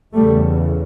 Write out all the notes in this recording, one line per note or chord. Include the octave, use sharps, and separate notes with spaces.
E2 C#3 G3 A3